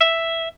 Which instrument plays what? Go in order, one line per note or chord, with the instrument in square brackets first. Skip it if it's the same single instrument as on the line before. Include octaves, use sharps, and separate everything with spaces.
[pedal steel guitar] E5